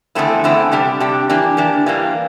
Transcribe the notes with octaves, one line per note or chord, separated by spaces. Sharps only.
E2 D3 A3 C4 E4
E2 D3 A3 C4 E4
C3 G3 D4 G4
C3 G3 D4 G4
E3 A#3 D4 G4
E3 A#3 D4 G4
G2 E3 G3 A#3